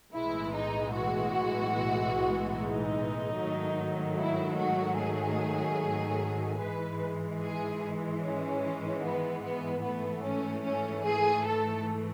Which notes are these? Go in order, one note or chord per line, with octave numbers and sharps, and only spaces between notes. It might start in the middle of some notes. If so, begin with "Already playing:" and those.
B1 A2 E3 G#3 E4
D#4
F#4
D#4
G#2 D#3 F#3 A3
E4
F#4
G#4
G#2 E3 G#3 B4
G#4
C#4
B3
B3
G#2 E3 A3 B3
C#4
C#4
G#4
A4